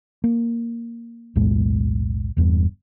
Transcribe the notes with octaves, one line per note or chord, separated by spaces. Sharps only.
A#3
B1 E2 A2 G#3
E1 E2 G2